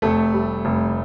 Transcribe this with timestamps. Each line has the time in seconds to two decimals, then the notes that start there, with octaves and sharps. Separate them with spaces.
0.02 F1 A3 A4
0.33 G3
0.65 F1